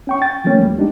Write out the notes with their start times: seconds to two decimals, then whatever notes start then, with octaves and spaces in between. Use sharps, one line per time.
0.07 C#4 G5 C#6
0.21 G5 A6
0.44 F3 G3 A3 A#3 C#4
0.60 D2 G3
0.77 G#3 D4 D#4 G4